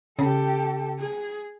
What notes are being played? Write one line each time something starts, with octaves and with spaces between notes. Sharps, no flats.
C#3 G4 A4
G#4